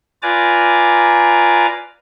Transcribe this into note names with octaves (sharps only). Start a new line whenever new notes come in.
F4 B4 D5 G#5 A#5 D6